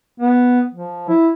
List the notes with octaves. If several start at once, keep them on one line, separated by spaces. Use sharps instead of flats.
B3
F3
E4